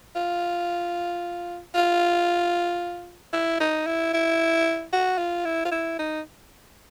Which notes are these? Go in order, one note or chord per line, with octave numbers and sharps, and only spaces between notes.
F4
F4
E4
D#4
E4
E4
F#4
F4
E4
F4
E4
D#4